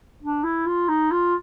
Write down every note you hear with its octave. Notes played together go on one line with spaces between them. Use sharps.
D4
E4
F4
D#4
F4